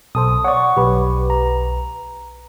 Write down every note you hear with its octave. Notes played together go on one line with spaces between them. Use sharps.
B1 A4 C5 D#6
C#5 D5 F#5 C#6
B1 G4 B4
A#5